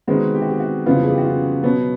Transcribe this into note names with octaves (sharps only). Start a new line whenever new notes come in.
C3 D#3 G#3 B3 F#4
G4
F#4
G4
F#4
F2 C#3 E3 G3 B3 F4
G#4
G4
F#4
F4
B2 F#3 B3